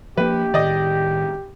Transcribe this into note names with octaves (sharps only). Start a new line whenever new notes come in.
F3 A#3 G4 B4
A2 D#3 D5 D#5